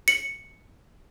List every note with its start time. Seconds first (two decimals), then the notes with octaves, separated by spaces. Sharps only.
0.08 C#7 F#7